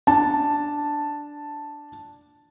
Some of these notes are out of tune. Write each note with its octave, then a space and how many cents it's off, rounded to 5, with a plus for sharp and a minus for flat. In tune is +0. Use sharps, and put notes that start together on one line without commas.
D4 +0 A5 +0